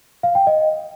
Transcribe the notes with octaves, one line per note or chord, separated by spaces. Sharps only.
F5
G5
D#5